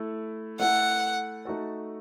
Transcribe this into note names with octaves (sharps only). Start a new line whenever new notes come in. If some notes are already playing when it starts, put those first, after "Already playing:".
Already playing: A3 E4 A4
A3 E4 A4 F#5
A3 D#4 F#4 A4